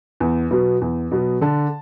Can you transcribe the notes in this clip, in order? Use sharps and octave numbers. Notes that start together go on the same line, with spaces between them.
E2
B2 F#3 B3
E2
B2 F#3 B3
D3 A5